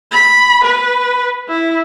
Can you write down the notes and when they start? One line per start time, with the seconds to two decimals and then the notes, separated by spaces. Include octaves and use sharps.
0.12 B5
0.64 B4
1.49 E4